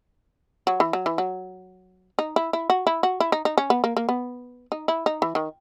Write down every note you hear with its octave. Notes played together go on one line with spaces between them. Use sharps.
F#3
E3
F#3
E3
F#3
D#4
E4
E4
F#4
E4
F#4
E4
D#4
D#4
C#4
B3
A#3
A#3
B3
D#4
E4
D#4
E3
D#3